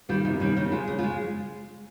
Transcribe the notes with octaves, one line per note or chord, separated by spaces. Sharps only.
D#3 G3 A#3 F4
C3 D#4
D#3 G3 A#3 C#4
C#3 D#4
G#3 F4
C#3
F4
G#3